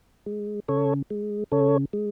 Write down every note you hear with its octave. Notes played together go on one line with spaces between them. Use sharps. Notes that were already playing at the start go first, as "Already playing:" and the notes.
G#3
C#3 A4 C#5
G#3
C#3 A4 C#5
G#3